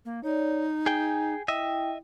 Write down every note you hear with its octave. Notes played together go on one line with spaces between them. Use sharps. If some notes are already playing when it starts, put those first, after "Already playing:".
A#3
D#4 C#5 D5
G#4 G5 G#5
E4 D#5 E5 G5